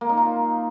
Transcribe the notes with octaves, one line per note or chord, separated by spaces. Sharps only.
A#3
D#4
F4